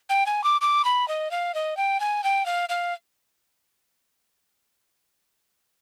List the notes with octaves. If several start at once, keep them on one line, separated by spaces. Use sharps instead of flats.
G5
G#5
D6
D6
B5
D#5
F5
D#5
G5
G#5
G5
F5
F5